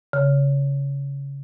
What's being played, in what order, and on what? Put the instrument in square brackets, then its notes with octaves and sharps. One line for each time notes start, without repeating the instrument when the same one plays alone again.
[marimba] C#3